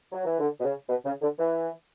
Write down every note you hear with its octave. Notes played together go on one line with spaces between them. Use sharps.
F#3
E3
D3
B2
C#3
B2
C#3
D3
E3